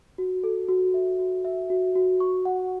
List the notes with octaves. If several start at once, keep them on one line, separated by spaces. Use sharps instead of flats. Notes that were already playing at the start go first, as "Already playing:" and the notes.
F#4
A4
F#4
E5
F#4
E5
F#4
F#4
C#6
F#5